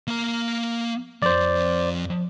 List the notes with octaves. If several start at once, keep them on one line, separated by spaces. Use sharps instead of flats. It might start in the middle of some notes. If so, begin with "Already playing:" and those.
A#3 A#5
F2 C5 D5